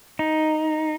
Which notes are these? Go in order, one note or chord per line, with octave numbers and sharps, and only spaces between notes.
D#4